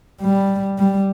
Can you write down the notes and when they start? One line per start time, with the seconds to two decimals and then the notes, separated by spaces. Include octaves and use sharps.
0.22 G3
0.78 G3